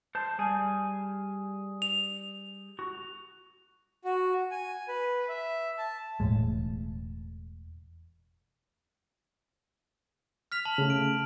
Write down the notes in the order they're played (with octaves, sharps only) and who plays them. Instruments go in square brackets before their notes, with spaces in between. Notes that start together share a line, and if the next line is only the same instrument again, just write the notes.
[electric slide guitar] C5 A5
G3 G#4 G#5
[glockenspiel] F7
[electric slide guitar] F#4
[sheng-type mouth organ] F#4
G#5
B4
E5
A5
[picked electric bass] E1 A2 G#3
[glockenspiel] F6 B6 F7
A5 F#7
[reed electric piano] C#3 A3
[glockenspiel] D7